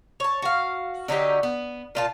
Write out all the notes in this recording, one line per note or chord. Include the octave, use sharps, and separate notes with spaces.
C#5 A5
F#4 F5
D3 F#3 D#4 G4
B3
A#2 F4 A5